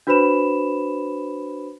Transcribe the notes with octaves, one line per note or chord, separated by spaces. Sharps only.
D4 F#4 B4 C5 B5 E7